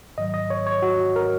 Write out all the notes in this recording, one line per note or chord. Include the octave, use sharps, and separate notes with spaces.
G#2 D#3 F#3 D#5
D#5
C#5
C#5
F#4
A#4